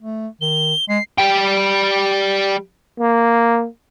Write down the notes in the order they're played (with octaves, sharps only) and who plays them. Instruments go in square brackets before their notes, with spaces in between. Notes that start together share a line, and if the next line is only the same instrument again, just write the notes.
[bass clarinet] A3
[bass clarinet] D#3 [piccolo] G7
[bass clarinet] G#3 [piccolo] C7
[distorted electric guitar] G3 G5
[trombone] A#3